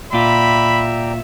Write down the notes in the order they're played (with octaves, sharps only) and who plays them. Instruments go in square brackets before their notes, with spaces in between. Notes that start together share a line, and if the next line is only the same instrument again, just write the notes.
[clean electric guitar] A#2 F4 [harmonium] D5 G5 A#5 [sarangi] E5 [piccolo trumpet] B5